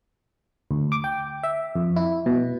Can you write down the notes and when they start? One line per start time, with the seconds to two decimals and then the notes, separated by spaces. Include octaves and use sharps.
0.71 D2
0.92 D6
1.04 G5
1.43 E5
1.76 F2
1.96 E4
2.26 B2